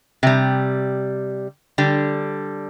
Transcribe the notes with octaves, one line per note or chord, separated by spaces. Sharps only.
C3 G3
D3 G3